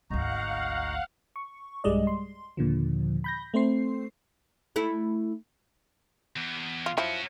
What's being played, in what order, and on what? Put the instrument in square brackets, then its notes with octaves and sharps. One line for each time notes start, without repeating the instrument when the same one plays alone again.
[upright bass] G#1 D2 [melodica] D#4 F#4 A#5 [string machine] F5 F#5
[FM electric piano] C#6
B1 G2 G3 G#3 D5 D#5
C6
D#2 A#2 D3 F3
B5 G6 A#6
A3 C4 C5 C7
[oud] A3 E4
[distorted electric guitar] E2
[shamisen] F4
[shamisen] F3 E4 [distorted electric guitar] C#4 F#4